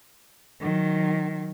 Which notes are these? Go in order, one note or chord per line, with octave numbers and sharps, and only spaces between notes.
D#3 F#3